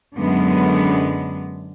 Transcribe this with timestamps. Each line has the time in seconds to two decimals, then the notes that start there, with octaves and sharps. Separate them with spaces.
0.17 F#2 D3 G#3 B3